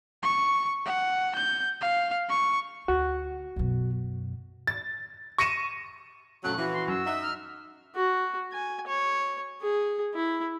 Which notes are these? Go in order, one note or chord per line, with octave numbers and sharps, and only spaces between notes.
C#6
F#5
G6
F5
C#6
D2 F#4
F#2 B2
A6
C#6 A#6 C#7 D#7 E7
A#1 F#3 A3 C#4 F#6
E3 F#4
C6
F#2 E6
D#4 E5 F#5
F6
F#4
G#5
C#5
G#4
E4